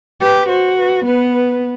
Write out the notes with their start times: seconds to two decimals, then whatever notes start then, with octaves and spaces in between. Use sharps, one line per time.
0.21 G4 B4
0.49 F#4 C5
0.77 B4
1.06 B3 B4
1.34 B4